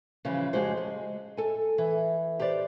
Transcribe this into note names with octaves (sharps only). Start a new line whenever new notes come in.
C#3 E3 F3 G3 F4
F2 C#3 G#3 F#4 G4 C5
G#3
A4 G#5
E3
G4 B4 C5 D5